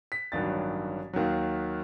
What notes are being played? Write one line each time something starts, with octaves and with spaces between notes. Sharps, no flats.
B6
A1 G2 D#3 F#3 A6
D#2 D#3 F#3